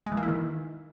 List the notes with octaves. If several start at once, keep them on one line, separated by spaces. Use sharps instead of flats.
G#3
E3
A#3
E4
D#3